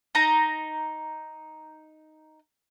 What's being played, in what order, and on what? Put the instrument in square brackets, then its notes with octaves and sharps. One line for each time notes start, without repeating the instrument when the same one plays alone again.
[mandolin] D#4 A#5